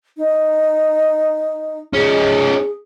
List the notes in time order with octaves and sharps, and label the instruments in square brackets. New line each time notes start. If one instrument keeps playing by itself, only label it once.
[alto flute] D#4
[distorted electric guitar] C#4 D#4 [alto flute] G#4